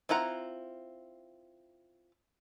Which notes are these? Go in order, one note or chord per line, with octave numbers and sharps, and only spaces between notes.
C4 E4 F4 F#5 A#5